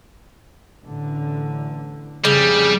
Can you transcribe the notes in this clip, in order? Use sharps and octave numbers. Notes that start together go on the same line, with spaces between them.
A1 D3
F2 A2 C#3 G3